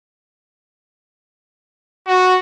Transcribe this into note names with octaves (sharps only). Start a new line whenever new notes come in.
F#4